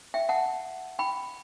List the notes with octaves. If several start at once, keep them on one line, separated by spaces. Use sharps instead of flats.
E5 G5
F#5 A5
G5 B5